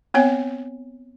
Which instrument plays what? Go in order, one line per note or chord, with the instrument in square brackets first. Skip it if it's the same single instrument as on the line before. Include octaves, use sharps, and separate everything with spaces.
[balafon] B3 C4 C#5 G#5